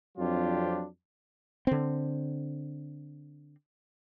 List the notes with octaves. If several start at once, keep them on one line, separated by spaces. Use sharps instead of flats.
F2 F#3 C4 D4 F4 G4
D3 C4